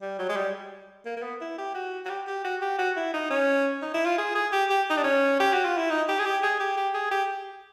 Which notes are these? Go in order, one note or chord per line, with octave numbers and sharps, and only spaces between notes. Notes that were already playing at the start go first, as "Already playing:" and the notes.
G3
F#3
G#3
G3
A#3
A#3
B3
E4
G4
F#4
F#4
G4
G4
F#4
G4
F#4
E4
D#4
C#4
D#4
E4
F4
G#4
G#4
G4
G4
D#4
D4
C#4
G4
F#4
F4
E4
D#4
G4
G#4
G4
G#4
G4
G4
G#4
G4